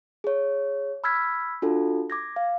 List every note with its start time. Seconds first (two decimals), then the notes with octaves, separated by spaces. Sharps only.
0.24 G#4 C#5
1.04 B5 E6 F6 G#6 B6
1.62 D4 F4 F#4 A4
2.10 D6 G#6 A#6
2.36 F5